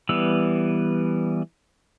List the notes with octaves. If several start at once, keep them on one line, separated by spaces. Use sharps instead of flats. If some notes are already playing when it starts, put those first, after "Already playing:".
E3 G3 B3 E6